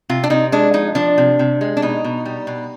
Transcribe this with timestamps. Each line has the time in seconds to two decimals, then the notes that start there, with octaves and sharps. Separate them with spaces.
0.09 C3 F4
0.24 D4
0.30 C3 D#4
0.52 G#3 D4
0.73 F3 D#4
0.95 F3 D4
1.18 C3
1.39 C3
1.61 G#3
1.77 D4
1.82 B2 D#4
2.04 B2
2.25 G3
2.47 B2